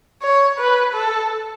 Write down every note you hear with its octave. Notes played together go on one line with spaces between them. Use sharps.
C#5
B4
A4